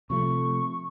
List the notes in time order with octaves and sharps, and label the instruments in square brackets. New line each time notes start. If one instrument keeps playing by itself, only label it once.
[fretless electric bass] C3 F3 A3 [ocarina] C#6